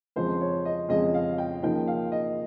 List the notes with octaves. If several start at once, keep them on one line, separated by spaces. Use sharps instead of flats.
F2 C#3 F3 G#3 C5
C#5
D#5
F2 C#3 F3 G#3 D#5
F5
G5
C#3 F3 A#3 D#4 G5
F5
D#5